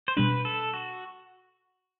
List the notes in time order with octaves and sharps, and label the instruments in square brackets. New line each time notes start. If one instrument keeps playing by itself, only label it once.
[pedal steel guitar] C5
[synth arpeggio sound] B2 G3 D4 [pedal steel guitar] B4
[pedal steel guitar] A4
F#4